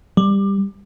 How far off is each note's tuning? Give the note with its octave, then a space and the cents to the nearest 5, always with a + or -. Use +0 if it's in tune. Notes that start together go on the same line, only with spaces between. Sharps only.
G3 +15